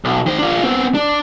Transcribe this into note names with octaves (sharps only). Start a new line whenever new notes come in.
B1
D#3 C5
D4 F4
B3 C4
D4